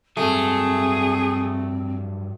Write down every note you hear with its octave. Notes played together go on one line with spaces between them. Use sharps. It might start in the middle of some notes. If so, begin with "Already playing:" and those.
G2 F#3 A3 C4 G#4